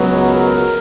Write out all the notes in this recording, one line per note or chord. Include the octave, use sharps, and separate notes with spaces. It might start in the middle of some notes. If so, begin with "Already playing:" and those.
Already playing: C#2 B2 F#3 B3
A#4